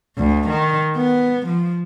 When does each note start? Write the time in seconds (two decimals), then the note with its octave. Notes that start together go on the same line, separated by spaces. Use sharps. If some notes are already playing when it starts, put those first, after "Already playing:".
0.17 D2
0.49 D#3
0.97 B3
1.46 F3